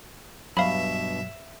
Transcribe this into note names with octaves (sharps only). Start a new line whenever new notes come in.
G2 B2 F#3 E5 F5 B5